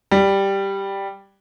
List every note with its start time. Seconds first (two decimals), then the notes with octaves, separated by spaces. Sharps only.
0.11 G3